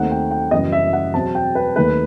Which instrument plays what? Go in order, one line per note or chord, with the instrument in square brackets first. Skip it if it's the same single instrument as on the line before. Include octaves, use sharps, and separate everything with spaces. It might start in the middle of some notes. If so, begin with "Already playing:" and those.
Already playing: [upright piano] D#2 D#3 A3 C4 D#4 F#5
G5
G5
F#1 F#2 E3 G3 B3 D#5
E5
F#5
E2 B2 F#3 C4 A5
G5
B4
D#2 D#3 A3 D#4 B4